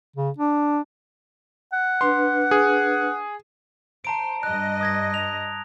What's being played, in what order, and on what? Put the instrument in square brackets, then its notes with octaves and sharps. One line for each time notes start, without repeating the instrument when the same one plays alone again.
[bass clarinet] C#3
D4
[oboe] F#5
[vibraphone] D4 B4 [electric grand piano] C6
[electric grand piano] G#4
[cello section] C5 [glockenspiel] A5 A#5 D7
[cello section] G2 D#5 [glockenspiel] F#6
[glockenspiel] D#6 G#6 A#6
F7